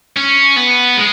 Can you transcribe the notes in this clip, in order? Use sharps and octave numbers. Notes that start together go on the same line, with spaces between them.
C#4
B3
G#3